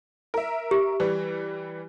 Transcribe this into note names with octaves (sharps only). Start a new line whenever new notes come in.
A#4 E5
G4
E3 G3